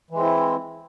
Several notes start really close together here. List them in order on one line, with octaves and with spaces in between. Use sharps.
E3 G#3 C4 E4